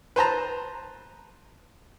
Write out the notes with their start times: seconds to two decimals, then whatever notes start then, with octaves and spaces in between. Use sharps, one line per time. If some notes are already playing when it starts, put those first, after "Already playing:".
0.16 B4 C5 A5 A#5